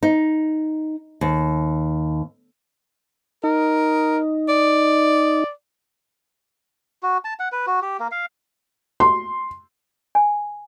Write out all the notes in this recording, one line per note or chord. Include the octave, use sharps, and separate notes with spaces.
D#4
D#2
D#4 A#4
D5
F#4
A5
F#5
B4
F#4
G4
A#3
F5
C6
G#5